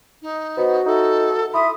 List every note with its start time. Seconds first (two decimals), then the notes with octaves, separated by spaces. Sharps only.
0.22 D#4
0.57 B3 F#4 C5 D#5 F#5
0.86 D#4 A4 E5 F#5
1.54 E4 E5 B5 C6 D#6